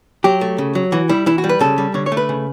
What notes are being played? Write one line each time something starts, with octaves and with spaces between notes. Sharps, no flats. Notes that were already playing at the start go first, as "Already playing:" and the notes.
F#3 G4
A3
C#3
F#3
E3 F#4
G3 E4
E3 E4
F#4
G3
B4
C#3 A4
G3
D3 C#5
C#5
A3
B4
C#3